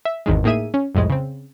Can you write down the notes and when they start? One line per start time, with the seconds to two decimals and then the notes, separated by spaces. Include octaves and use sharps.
0.05 E5
0.26 G#1 E2 D#3 G#3
0.44 A2 A#3 D#4 G#4 E5 D#7
0.74 C#4
0.95 C2 F2 A2 G#3
1.10 C#3 C4